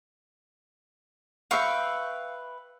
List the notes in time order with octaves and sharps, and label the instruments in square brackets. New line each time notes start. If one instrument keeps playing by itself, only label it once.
[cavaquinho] B4 E5 [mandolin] F5 G5 C#6